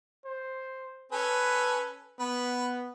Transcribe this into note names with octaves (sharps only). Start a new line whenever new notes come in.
C5
C#4 A4 B4
B3 B4